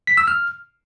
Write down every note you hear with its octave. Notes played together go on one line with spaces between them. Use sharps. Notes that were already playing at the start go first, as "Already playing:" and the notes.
B6
E6
F6